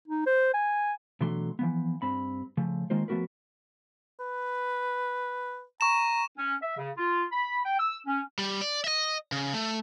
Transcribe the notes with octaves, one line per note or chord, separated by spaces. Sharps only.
D#4
C5
G#5
B2 E3 F#3 A3 D4 C6
E3 F3 B3
G2 C4 B5
C#3 F3 A3
D#3 G#3 A#3 F4 C5
F3 A3 B3 F#4 A#4 B4
B4
A#5 C#6 E7
C#4
E5
C#3
F4
B5
G5
E6
C#4
G3
D5
D#5 E5
C#3
A3